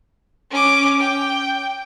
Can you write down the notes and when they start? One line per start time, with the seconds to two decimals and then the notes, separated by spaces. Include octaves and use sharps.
0.51 C#4 D6
0.99 G5